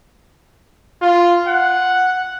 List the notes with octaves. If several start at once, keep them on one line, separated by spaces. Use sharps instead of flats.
F4
F#5